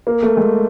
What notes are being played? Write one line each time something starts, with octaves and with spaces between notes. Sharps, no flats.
A#3
A3
G#3